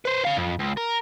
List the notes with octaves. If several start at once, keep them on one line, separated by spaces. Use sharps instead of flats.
B4 C5
C#5 F5
F2
C#2
A#4